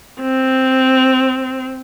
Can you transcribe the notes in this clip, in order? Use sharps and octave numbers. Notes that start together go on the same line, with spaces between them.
C4